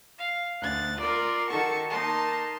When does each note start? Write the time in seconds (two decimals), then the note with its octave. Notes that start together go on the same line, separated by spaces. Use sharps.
0.17 F5
0.59 D2 F#6 A6
0.98 F4 A#4 D5 C6
1.49 D#3 F#4 A4 A5 C#6
1.90 A#3 D#4 A5 C6